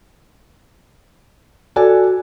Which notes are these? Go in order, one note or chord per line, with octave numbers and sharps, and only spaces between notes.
F#4 A4 D5 G#5